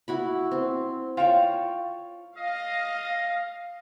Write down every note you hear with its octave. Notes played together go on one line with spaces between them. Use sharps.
E4 F#4 B5
C4
F4 C#5 F5 G5 A5 A#5
D#5 F5